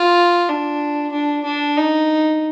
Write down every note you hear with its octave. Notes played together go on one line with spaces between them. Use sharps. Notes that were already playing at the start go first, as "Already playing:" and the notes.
Already playing: F4
D4
D4
D4
D#4